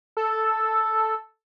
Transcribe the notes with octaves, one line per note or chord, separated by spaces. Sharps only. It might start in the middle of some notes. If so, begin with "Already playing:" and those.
A4